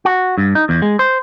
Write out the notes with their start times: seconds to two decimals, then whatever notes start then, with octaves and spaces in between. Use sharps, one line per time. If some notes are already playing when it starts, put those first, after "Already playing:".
0.05 F#4
0.38 G2
0.55 D#4
0.69 E2
0.82 G#3
0.99 C5